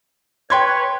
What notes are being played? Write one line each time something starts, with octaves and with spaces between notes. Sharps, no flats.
B4 C#5 G5 C6 G#6